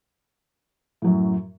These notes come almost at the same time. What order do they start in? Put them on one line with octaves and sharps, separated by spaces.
A2 F#3 F#2